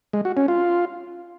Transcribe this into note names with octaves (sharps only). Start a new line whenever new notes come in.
G#3
F#4
C#4
F4